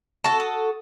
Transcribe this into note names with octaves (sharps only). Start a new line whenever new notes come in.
F#4 A4 A5
D#6